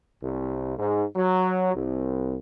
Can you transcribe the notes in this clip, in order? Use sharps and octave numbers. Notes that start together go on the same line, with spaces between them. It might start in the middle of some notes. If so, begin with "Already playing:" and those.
C2
G#2
F#3
C2